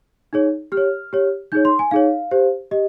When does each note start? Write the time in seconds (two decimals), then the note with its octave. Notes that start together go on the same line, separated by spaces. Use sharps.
0.33 D#4 G#4 C#5
0.72 G4 F6
0.77 C#5
1.13 G4 C#5
1.52 D#4 G#4 C#5 G6
1.65 C6
1.79 G#5
1.91 D#4 G#4 C#5 F5
2.31 G4 C5
2.71 G4 D#5